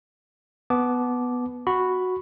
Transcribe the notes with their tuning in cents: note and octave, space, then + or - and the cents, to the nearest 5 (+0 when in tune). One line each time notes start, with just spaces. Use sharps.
B3 +0 A5 -25 D6 +0
F#4 -5 B5 +5